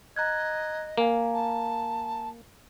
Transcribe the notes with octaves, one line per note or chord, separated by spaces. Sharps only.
D#5 A#5 F#6 G#6
A#3 F5 G#5 A#5
A5